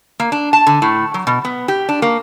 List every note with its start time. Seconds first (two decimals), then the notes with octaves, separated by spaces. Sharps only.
0.20 A#3
0.32 D4
0.53 A5
0.67 D3
0.82 A2
1.14 F#3
1.27 B2
1.45 B3
1.68 G4
1.89 D4
2.02 A#3